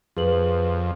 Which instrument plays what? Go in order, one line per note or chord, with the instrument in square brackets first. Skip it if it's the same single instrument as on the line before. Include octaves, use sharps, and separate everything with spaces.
[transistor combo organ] F2 [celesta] G#4 B4 F#7